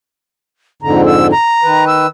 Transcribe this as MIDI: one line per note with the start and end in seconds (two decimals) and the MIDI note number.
0.82 1.32 41
0.82 1.32 44
0.82 1.32 50
0.82 1.04 82
1.06 1.27 88
1.32 1.85 82
1.63 2.06 51
1.63 2.06 71
1.87 2.07 88